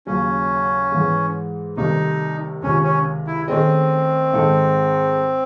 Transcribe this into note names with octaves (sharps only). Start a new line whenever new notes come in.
D#2 C#3 F#3 C#4
G#2 E3 G#3
C2 C3 D#3 A3 D#4
C#2 C3 D#3 C#4
C#4
E4
D#3 A3 C4 C#4 G#4 D#5
G#2 D#3 G#3 D#4 A4